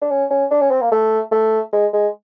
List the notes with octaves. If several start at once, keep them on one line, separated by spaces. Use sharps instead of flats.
D4
C#4
C#4
D4
C#4
C4
A#3
A3
A3
G#3
G#3